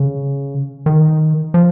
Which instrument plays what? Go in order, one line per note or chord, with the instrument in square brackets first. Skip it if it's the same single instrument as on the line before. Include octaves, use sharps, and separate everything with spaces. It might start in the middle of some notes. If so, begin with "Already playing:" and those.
Already playing: [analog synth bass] C#3
D#3
F3